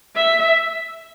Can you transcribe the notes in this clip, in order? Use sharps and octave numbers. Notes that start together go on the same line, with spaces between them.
E5